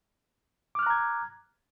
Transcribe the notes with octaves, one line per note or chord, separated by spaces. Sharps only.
A#5 D6 F6 F#6 G#6